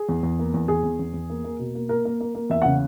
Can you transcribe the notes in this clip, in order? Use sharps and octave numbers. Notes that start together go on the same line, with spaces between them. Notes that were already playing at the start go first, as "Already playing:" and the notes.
Already playing: G#4
E2
E2
A#3
E2
E2 G#4
E2
E2
E2
A#3
A#3
B2
A#3
A#3 A#4
A#3
A#3
A#3
E2 E5
C#3 F#5